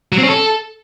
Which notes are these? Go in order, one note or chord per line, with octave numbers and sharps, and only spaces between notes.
F#3
C4
C#4
A4